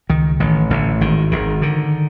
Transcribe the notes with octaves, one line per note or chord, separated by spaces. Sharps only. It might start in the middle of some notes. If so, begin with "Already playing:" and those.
C#2 D#3
A1 D#3
A1 D3
G#1 D#3
G#1 D#3
D3 D#3